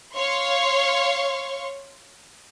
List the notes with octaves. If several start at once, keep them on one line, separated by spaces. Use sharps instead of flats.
C#5 F5 C6 C#6